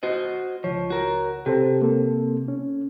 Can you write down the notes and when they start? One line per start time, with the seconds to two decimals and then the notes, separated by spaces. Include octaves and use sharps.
0.03 F#4 C5 D#5
0.64 C#2 F3 C#5
0.90 F#4 A#4
1.46 C3 G4 A4 C5
1.82 A#3 A4
2.48 C#4